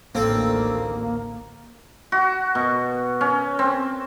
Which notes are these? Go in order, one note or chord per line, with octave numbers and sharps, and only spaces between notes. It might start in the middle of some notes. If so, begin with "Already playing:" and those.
A1 D2 D#3 A#3 C4 A4
F#4
B2
C#4
C4